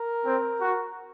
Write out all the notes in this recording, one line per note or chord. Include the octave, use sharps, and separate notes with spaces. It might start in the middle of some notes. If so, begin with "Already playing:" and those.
Already playing: A#4
C4
F#4